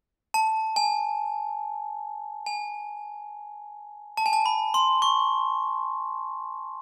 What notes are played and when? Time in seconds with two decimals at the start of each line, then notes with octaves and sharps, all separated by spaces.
0.34 A5
0.76 G#5
2.46 G#5
4.17 A5
4.26 G#5
4.33 A5
4.46 B5
4.74 C6
5.02 C#6